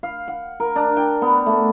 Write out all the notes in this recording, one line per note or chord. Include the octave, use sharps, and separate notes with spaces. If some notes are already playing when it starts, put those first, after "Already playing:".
F5
F#5
A#4
D4
G5
B3
A3